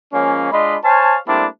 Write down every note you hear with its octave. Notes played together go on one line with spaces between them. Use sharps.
F3 G#3 A#3 C#4
G#3 D4 F4 D#5 B5
C5 C#5 F5 G#5 A5
G3 A3 A#3 C4 D4 E4